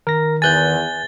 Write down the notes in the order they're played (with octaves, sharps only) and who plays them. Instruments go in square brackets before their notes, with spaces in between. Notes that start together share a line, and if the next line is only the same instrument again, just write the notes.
[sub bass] D#3 [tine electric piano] A#4 A#6
[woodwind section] E2 [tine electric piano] G#5 F#6 G6 [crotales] A6 G7